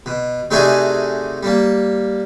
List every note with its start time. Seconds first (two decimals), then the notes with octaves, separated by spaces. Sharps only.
0.06 B2
0.51 C3 A3 D4 D#4 F#4 G#4
1.43 G3 A#3